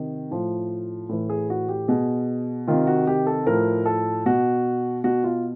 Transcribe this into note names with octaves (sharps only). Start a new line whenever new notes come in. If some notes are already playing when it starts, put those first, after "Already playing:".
Already playing: C3 D#3
A2 F3
A2 E3
G#4
F#4
G4
B2 G#4
C3 D#3 F4
F#4
G4
A4
A2 F3 A#4
A4
B2 F#4
B2 F#4
F4